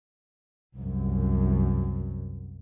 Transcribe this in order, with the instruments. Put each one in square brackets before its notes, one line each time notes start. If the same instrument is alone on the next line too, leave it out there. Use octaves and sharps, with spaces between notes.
[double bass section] C2 F#2